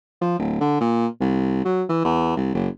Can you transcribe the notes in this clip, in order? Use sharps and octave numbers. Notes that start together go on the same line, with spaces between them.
F3
D1
D3
A#2
C2
F#3
E3
E2
C2
F#1